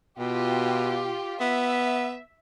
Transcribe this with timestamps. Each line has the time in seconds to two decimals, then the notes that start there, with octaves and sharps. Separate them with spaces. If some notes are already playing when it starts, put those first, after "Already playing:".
0.19 B2 F4 G4
1.41 B3 E5